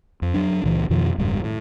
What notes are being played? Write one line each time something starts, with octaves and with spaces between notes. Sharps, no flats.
F2
F#3 D4
C#2 A#2 E3
F2 B2 D#3 F3
F#1 D#2 G#2 G3
A2